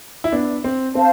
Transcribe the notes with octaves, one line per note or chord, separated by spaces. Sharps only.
E4
B3 D4
C4
C4 C5 F5 A5